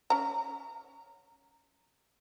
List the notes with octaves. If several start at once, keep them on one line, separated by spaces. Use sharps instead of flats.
C#4 A#5